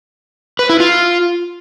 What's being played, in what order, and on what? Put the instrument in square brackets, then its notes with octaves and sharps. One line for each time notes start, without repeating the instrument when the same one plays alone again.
[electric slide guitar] B4
E4
F4